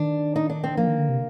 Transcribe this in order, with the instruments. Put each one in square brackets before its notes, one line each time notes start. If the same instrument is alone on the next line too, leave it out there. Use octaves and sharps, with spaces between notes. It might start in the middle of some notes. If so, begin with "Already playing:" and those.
Already playing: [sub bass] D#3 [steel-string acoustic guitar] D4
[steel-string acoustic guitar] D#4
D4
C4
[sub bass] F3 [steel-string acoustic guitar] A#3
[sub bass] D#3
D3
C3